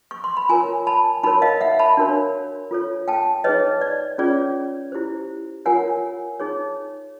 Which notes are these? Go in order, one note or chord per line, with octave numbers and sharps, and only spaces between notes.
C#6
C6
B5
F4 A#4 C#5 G#5 A#5
A5 B5
D#4 F#4 A#4 C#5 A5 B5
D#5 F5
E5 F#5
A5 B5
D4 F#4 A#4 C#5
F4 A4 C#5
G5 A5
D#4 G#4 B4 C#5 D#5
D5
C#4 F4 G#4 C#5 D5
E4 G4 C5
F4 A#4 C#5 F#5 G#5
D#4 G#4 C#5